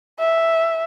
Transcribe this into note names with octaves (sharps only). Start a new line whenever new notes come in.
E5